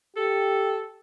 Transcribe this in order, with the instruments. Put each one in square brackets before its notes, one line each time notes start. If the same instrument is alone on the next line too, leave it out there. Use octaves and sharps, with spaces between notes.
[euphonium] G4 [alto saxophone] A4